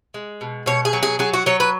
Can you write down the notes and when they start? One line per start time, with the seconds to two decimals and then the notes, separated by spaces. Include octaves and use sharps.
0.14 G#3
0.41 B2
0.66 B2 C#5
0.85 G#4
0.93 F#3
1.03 G#4
1.19 F#3 G#4
1.33 F#4
1.46 F#3 C#5
1.60 B4